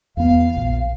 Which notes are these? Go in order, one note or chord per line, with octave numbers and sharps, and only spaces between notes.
E2 B3 F5
A#1